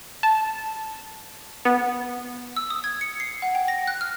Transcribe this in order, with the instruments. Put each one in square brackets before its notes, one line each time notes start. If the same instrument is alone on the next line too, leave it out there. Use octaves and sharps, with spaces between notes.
[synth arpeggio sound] A5
B3
[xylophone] E6
D#6
G#6
C#7
C7
F#5
G5
A#6
F#6
F6